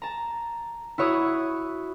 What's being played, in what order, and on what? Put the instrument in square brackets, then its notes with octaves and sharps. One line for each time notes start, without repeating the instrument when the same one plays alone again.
[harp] A5 A#5
E4 F#4 C#5 D#6